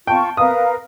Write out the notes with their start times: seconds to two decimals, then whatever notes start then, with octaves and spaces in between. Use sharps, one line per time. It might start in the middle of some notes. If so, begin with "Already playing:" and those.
0.07 F4 G5 A5 C#6
0.37 A#4 B4 F5 D#6